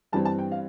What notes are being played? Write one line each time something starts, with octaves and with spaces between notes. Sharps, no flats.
G2 E3 G3 C4 A5
A5
G5
F5